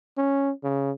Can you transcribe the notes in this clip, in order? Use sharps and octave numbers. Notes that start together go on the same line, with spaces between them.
C#4
C#3